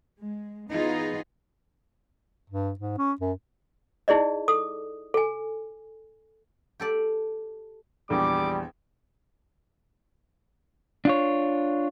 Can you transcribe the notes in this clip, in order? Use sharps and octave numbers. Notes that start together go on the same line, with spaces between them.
G#3
E3 B3 D#4 F4 G#4 D#5
G2
G#2
C#4
F#2
D#4 E4 G#4 D5 D#5
A4 D#6
A4 G#5
G4 A4 D5
A#1 E2 G3 D6
D4 F4 C#5